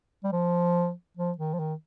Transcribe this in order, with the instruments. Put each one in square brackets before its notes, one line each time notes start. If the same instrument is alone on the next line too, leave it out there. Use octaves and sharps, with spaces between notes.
[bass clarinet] G3
F3
F3
D#3
F3
D#3